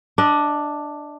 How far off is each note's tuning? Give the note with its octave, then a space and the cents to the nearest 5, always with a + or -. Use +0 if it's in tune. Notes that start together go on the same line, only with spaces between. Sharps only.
D4 +5 D#5 +35